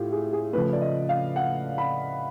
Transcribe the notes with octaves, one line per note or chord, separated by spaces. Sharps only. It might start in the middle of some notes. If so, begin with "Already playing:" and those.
Already playing: A2 F4 G4
G#4
G#4
C#3 F3 A3 B4
D5
D#5
F5
F#5
B5